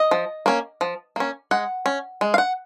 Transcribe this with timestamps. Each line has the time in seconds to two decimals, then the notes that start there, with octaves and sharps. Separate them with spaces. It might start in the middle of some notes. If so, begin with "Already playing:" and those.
Already playing: D#5
0.11 F3
0.46 A#3 C#4
0.81 F3
1.16 A#3 C#4
1.51 G#3 F#5
1.86 C#4
2.21 G#3
2.34 F5
2.38 F#5